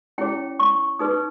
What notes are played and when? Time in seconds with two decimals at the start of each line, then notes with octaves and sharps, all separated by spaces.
0.18 C#4 E4 G#4 C#5 G5
0.60 C#6
0.99 D#4 G#4 B4 D#6